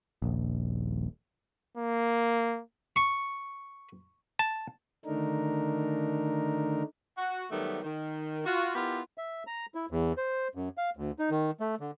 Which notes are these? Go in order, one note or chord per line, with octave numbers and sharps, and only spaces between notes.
D#1 A#1
A#3
C#6
A5
D3 D#3 A3 D4 D#4 A#4
F#4
D#3 F#3 G3 A3 B3
D#3
F4 F#4
B3 E4 F4 G4 A#4
E5
A#5
E4
E2
C5
F#2
F5
D2
D#4
D#3
A3
D3